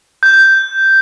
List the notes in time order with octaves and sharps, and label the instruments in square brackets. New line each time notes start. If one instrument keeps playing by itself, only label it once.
[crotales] G6